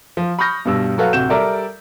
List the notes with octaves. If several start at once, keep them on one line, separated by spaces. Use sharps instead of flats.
F3
B5 C#6 D#6 F6 G6 A#6
G2 B2 G3 E6
F#3 F#4 A4 B4 F5
D1 C3 F#4 G6 E7
G3 A4 A#4 D5 E5